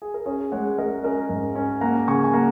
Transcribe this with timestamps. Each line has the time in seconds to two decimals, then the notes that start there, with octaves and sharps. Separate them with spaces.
0.02 G#4
0.14 A#4
0.26 C#4 G#4 C#5
0.52 G#3 C#5 F#5
0.78 G#3 A#4 D#5
1.03 C#4 A#4 D#5
1.29 G#2
1.55 C#4
1.81 A#3 F#5 A#5
2.08 C#3 G#5 C#6
2.24 G#5
2.33 A#3 F#5 A#5